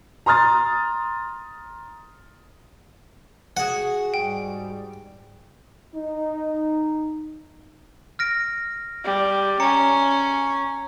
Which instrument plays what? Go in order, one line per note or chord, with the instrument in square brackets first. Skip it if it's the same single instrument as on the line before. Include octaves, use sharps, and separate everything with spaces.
[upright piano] A#5 C6 D#6 F6 A6
[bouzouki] F#4 G#4 [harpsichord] F#5
[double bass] G#2 G3 [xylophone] G5
[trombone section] D#4
[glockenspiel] F6 A#6 D7
[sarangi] G3
[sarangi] C#4 [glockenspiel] A#5 C#7